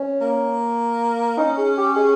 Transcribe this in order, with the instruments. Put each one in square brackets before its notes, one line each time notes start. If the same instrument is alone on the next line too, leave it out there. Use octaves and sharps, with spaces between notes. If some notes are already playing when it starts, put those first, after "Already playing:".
Already playing: [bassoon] C#4
[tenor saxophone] A#3
[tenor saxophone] C#4 [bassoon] D#4
[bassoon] G#4
G4
G#4